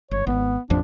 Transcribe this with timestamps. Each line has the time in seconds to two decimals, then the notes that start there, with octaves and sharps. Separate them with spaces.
0.11 G1 C#5
0.27 G#1 B3
0.70 A1 F2 F3 D4